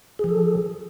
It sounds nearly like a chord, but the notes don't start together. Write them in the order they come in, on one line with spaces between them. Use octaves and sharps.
G#4 F3 A4